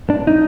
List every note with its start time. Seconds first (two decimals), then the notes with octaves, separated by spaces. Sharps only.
0.10 D4
0.27 D#4